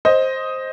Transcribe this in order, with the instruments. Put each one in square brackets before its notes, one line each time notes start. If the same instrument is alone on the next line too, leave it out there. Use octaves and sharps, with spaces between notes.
[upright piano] C5 D#5